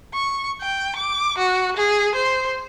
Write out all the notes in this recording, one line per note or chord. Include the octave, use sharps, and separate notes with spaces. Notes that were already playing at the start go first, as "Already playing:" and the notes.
C#6
G5
D6
F#4
G#4
C5